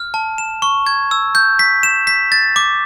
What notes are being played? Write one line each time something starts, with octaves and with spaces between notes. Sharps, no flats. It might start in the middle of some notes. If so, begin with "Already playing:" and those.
Already playing: F6
A5
E7
C#6
G#6
E6
G6
B6
E7
B6
A6
D6